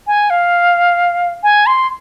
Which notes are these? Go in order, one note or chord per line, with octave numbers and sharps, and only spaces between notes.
G#5
F5
G#5
C6